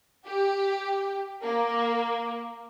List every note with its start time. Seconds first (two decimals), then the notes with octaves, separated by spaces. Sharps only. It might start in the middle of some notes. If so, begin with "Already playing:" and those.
0.25 G4
1.43 A#3